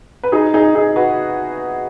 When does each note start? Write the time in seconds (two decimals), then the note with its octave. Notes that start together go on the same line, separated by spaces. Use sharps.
0.23 B4
0.32 D#4 G#4
0.54 D#4 G#4
0.75 D#4 G#4
0.96 F#4 B4